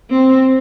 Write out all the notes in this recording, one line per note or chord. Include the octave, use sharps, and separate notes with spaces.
C4